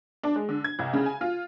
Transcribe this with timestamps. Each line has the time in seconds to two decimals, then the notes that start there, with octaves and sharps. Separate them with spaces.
0.23 D4
0.36 G#3
0.49 D3
0.64 G#6
0.79 C2
0.93 C#3
1.06 G#5
1.21 F4